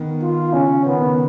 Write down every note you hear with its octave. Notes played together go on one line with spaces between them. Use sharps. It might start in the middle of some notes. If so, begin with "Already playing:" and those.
Already playing: D#3 B3
F4
C#3 C#4
D#3 B3
C#3